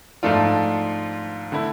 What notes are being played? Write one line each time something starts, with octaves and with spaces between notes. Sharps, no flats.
G#2 F3 A3 D4 F4
D3 A3 E4